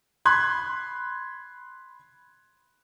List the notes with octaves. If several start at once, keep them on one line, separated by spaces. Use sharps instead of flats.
B5 C6 F#6 G#6